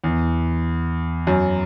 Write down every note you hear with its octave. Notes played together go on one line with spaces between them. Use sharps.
E2
F#2